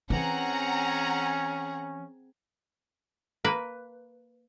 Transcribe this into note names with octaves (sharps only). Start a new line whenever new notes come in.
E3 C4 C#4 G#4 F#5 A#5
A#3 B4